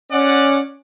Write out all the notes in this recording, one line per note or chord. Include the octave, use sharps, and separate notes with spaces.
C#4 D5 F#5